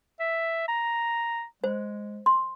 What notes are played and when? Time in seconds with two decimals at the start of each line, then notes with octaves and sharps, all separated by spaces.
0.20 E5
0.68 A#5
1.64 G#3 C5
2.26 C6